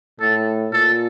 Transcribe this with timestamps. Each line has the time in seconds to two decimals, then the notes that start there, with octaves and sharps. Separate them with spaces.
0.20 A2 A4
0.72 A#2 A4